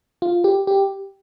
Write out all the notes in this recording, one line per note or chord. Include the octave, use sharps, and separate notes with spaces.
F4
G4
G4